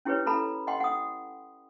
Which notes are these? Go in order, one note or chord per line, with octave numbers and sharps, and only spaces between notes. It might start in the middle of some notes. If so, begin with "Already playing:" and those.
C#4 E4 G4 G#4 B4 C#5
E4 A4 A#5 B5
D#5 F#5 G5 C6
F#5 D#6